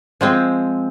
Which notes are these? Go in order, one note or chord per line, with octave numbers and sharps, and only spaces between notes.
F3 G#3 C4